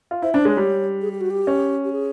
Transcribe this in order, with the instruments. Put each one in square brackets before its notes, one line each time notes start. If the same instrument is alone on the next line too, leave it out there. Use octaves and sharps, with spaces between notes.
[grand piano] F4
[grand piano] E4 [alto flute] C5
[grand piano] D4 [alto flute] C5
[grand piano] G#3 [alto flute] C#5
[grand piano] G3
[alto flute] G#4
G4
F#4
G4
[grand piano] C#4
[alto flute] G4
G#4